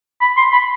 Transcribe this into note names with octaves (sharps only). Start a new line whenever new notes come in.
B5
C6
B5